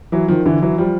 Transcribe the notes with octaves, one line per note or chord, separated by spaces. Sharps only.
E3 F#3
D#3 F3
D3 E3
E3 F#3
F3 G3